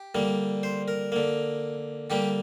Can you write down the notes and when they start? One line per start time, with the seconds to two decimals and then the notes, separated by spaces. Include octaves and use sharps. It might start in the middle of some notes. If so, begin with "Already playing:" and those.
Already playing: G4
0.15 D3 G3 A#3
0.63 C5
0.88 A#4
1.12 D3 A#3
2.10 D3 G3 A#3 G4